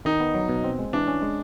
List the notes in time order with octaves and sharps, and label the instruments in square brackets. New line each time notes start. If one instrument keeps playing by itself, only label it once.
[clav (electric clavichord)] D#3 [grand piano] D#4
[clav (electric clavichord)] B3
F#3
B2
C4
G#3
[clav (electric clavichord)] E3 [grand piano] D4
[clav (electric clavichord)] C#4
G#3